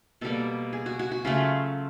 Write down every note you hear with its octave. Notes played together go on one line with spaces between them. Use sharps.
B2 G3 A#3 A4
G#4
F#4
F#4
F#4
C#3 F#3 A3 F4